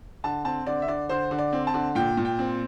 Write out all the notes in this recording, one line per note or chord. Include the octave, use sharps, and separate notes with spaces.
D3 A5
C4 A5
D3 D5
E5
D3 D5
D3 C5
D3
D5
C4
A5
D3
A#2 G5
A#2
G5
C4